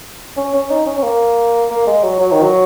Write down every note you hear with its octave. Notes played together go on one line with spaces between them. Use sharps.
C#4
C#4
D#4
C#4
C#4
A#3
A#3
G#3
F#3
F#3
D#3
F#3